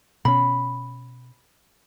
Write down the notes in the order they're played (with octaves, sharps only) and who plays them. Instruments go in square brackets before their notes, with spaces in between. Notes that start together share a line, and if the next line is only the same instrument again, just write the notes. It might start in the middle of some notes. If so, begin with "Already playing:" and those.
[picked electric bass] B2 C#4 [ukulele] B5